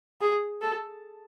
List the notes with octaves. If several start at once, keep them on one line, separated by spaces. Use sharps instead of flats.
G#4
A4